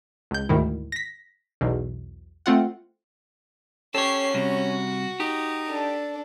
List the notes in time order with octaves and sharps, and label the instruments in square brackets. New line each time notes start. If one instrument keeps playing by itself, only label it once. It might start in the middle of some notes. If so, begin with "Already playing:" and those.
[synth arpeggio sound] C#2 G6
D2 G#2 D#3 E4
A#6 B6
B1 E2 B2
A3 C4 F4 F#5
[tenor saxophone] C#4 [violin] G4 C7 [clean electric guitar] A4 C#5
[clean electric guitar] C3 G3 [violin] F#4
[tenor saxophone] D#4 [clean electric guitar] G4
[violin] D4 A4